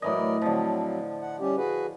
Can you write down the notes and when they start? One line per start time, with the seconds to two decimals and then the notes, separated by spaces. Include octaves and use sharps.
0.02 A2 E3 F#3 A#4 D5 D#5
0.42 D3 F3 F#3 C4
1.21 F#5
1.40 G3 C#4 G4
1.57 F#4 G#4 B4